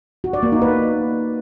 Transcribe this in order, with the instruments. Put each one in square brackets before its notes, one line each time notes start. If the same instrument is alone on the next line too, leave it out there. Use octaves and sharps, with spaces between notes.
[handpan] F#4
D5
A#3
D#4
B4